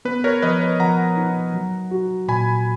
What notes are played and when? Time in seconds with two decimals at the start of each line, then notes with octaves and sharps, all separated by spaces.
0.05 B3 B4
0.24 A#4 C#5
0.42 F3 B4 D#5
0.61 B4
0.80 F3 F#5 A#5
1.17 D#4
1.54 F#3
1.91 F#4
2.28 A#2 G#5 B5